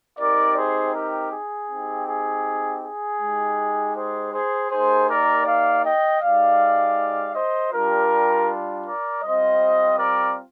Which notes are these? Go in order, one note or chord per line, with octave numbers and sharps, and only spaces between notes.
C4 D#4 G4 A#4 D5
G#4 C5
G4 A#4
G#4
C4 D#4 G4
G#4
G#4
G#3 D#4 G4
G#4 C5
G#4 C5
A#3 D#4 G4 G#4 C5
A#4 D5
D5 F5
D#5 G5
G#3 D#4 G4 D5 F5
C5 D#5
G3 D4 F4 G4 A#4
A#4 D5
G3 C4 F4 C5 D#5
A#4 D5